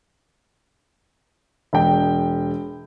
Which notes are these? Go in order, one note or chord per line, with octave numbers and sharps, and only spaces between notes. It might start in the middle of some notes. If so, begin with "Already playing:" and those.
E1 G5